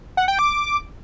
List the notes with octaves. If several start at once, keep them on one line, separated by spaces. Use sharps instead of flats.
F#5
G5
D6